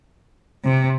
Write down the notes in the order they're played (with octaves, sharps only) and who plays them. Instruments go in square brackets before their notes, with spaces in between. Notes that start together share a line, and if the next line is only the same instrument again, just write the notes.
[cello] C3